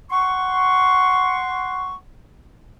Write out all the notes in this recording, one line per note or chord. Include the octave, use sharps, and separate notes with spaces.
F#5 C6 C#6